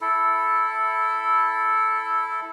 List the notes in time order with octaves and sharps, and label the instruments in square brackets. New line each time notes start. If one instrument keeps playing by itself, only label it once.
[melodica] E4 A4